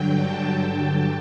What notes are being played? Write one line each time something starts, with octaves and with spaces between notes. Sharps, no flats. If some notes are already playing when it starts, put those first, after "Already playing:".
Already playing: G2 D3 F#3 G5
A5